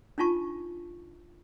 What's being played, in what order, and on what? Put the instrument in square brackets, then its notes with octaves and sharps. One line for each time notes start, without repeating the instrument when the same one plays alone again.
[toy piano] D4 D#4 F4 A5 C#6